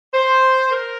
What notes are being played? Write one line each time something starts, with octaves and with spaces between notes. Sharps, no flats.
C5
A#4